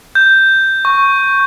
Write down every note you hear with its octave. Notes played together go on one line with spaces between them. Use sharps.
G6
C#6